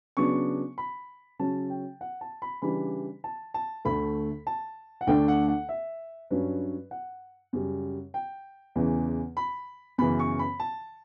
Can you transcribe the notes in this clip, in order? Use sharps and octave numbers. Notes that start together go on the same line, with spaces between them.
C#3 F#3 B3 D4 C#6
B5
C#3 F#3 C#4 A5
G5
F#5
A5
B5
C#3 E3 G3 D4 B5
A5
A5
D2 D3 A3 B5
A5
F#5
D2 D3 A3 D4 G5
F#5
F#5
E5
G2 F#3 C#4 B4
F#5
F#2 C#3 G3
G5
E2 C#3 E3
B5
F#2 C#3 E3 B3 B5
C#6
B5
A5